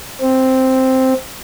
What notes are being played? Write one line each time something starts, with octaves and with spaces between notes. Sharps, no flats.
C4